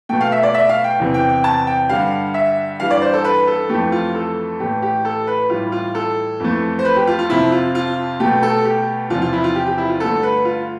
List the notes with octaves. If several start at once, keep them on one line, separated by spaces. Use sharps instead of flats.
B2 A3 G5
F5
E5
D5
E5
F5
G5
E2 C3 E3
G5
G5
A5
G5
G2 D3 G3 F5
E5
G2 E3 G3 F5
D5
C5
A4
B4
A4
F2 E3 A3 G4
F4
A4
A2 E3 A3 G4
G4
A4
B4
A2 E3 G3 F4
F4
A4
F2 E3 A3
C5
B4
G4
F4
F4
F2 C3 F3 E4
F4
F4
B2 A3 G4
A4
G4
E2 C3 F3 F4
F4
E4
F4
G4
G4
E4
F4
G2 D3 A3 A4
B4
F4